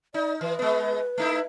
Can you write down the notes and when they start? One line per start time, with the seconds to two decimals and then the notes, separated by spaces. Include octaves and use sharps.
0.14 D#4 D5
0.41 E3 B4
0.59 G#3 B3
1.18 A3 D#4 E4